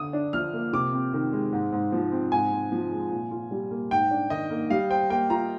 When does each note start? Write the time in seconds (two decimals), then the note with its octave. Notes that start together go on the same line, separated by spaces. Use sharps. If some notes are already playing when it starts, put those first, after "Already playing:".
Already playing: D3 D#6
0.13 D4
0.33 F3 F6
0.53 A#3
0.73 C3 D6
0.93 C4
1.13 D#3
1.32 G#3
1.52 G#2
1.72 G#2
1.92 F3
2.12 C4
2.32 G#2 G#5
2.52 C4
2.72 F3
2.91 G#3
3.11 A#2
3.31 F4
3.51 G3
3.71 A#3
3.91 G#2 G5
4.11 D4
4.30 D#3 D#5
4.50 A#3
4.70 G3 F5
4.90 C5 G5
5.10 A#3 G5
5.30 F4 A#5